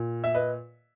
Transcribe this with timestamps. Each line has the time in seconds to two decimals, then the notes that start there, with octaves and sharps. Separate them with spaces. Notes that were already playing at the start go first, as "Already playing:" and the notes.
Already playing: A#2
0.24 E5
0.34 B4 D#5